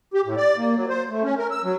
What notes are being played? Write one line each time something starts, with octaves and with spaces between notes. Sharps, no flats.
G4
A2
D5
A#3
F#3
C5
A3
C#4
A#4
E6
F#3